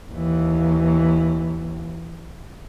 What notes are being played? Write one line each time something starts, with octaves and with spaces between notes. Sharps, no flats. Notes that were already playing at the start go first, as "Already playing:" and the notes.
D#2 E3